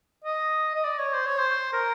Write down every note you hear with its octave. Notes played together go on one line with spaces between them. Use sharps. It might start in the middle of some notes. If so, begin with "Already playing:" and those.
D#5
D#5
D5
C#5
C5
C#5
C5
A#4